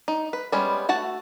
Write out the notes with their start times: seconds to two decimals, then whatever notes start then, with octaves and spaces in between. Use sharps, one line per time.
0.08 D#4
0.33 B4
0.52 G3 G#3 B3 C#4
0.89 A3 F#4 F#5 A5